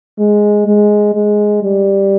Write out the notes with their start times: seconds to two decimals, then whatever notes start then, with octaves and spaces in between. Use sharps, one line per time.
0.19 G#3
0.67 G#3
1.15 G#3
1.63 G3